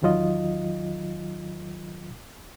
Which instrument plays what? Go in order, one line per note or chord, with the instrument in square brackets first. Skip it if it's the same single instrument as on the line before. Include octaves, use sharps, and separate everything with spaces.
[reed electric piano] E2 D#3 F#3 F4 D#5